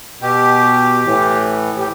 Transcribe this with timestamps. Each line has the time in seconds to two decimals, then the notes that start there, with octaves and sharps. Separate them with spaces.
0.21 B2 G4
1.05 A2 E3
1.78 G4